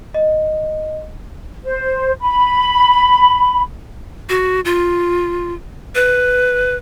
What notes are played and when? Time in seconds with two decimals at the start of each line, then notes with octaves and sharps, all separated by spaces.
0.14 D#5
1.63 C5
2.20 B5
4.29 F#4
4.65 F4
5.95 B4